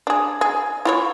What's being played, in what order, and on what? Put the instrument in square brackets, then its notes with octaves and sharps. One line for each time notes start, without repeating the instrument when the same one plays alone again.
[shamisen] D4 G#4
G#4
E4 F4 C#5